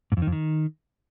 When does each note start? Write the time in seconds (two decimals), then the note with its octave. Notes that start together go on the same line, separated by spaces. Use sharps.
0.12 G#2
0.17 F2
0.22 D#3
0.27 F2
0.32 D#3